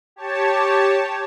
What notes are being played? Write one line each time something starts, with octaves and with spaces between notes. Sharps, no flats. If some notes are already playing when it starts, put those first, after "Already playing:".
G4 C#5 A5